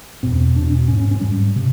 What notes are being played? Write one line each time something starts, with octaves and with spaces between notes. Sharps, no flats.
E2 B2 C4
E2 B2 D4
C#4
G#2 C#4
C#4
C#4
G#2 G3
C3